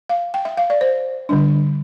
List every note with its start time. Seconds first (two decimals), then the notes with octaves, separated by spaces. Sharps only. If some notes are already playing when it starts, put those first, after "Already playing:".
0.09 F5
0.34 G5
0.45 E5
0.57 F5
0.70 D5
0.81 C5
1.29 D3 G3 D4